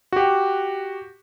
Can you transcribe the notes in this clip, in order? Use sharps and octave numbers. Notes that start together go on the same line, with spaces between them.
F#4 G4